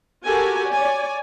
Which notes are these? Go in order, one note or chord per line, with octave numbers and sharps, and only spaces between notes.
F#4 G4 A4 A#4 G#5
C#5 D5 G#5